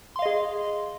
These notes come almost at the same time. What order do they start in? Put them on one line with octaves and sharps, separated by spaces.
C6 F5 D#5 G#4